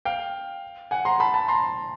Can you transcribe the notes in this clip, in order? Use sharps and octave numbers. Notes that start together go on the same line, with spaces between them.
F5 G5
F#5 G#5
A#5 C6
A5 B5
A5 B5
A#5 C6